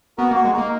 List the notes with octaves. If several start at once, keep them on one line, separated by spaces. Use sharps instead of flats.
B3 F#4 A#4
A#3 F#4
G#3
A#3 D#4